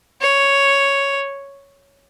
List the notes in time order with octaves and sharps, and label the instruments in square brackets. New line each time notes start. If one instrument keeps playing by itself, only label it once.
[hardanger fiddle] C#5